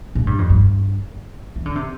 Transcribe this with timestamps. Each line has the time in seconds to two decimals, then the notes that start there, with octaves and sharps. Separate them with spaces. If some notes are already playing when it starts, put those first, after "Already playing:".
0.15 A2
0.27 G2
0.38 F2
0.50 G2
1.56 E3
1.65 D3
1.76 C3